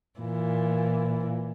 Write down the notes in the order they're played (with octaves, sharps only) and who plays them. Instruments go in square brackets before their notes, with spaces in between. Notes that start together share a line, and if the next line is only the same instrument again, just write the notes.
[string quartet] A#2 E3